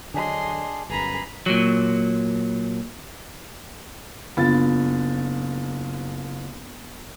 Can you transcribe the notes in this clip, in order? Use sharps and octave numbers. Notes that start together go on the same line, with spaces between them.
D3 F#3 D4 G#4 D#5 C6
G1 F#2 G#4 B4 A#5 B5
A#2 F#3
F#1 B3 D4 F4 A6